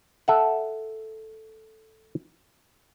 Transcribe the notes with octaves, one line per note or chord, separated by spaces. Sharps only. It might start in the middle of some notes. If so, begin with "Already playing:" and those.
A4 E5 F#5